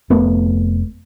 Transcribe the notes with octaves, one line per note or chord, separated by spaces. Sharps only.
F1 A3 B3